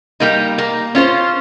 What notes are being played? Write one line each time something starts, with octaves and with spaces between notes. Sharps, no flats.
G3 A#3 D#4
A#3
C#4 F4 C5